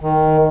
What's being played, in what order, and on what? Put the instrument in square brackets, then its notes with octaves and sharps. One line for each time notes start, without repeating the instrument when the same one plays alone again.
[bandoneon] D#3